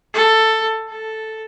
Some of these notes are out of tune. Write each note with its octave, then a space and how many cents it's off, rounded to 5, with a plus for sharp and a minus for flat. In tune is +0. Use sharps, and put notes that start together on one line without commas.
A4 +10
A4 +0